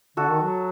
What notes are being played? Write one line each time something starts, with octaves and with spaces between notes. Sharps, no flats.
D3 F#4 A4
D#3
F#3